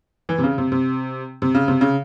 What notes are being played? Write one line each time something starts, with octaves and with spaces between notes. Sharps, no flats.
E3
C3
C#3
C3
C3
C3
C#3
C3
C#3